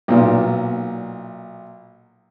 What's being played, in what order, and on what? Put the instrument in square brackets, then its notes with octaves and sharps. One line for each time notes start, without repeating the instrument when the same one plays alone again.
[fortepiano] B1 A#2